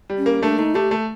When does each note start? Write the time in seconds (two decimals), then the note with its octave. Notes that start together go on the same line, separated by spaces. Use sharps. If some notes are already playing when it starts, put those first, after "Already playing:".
0.10 G3
0.18 C#4
0.26 A#3
0.42 A3 D4
0.59 A3 D#4
0.75 A3 G4
0.91 A3